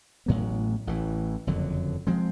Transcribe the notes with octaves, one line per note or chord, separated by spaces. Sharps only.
A1 A2 F#3 B3
A1 A2 E3
F#1 F2 D3 F#3
F3 G#3 C4